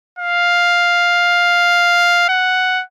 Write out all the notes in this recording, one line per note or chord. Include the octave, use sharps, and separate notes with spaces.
F5
F#5